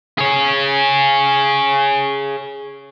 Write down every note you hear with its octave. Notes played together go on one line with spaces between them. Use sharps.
G#4 C#5